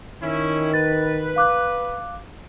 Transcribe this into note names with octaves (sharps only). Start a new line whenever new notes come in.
D#3 C#4 E4
B4 A6
F5 D6 F#6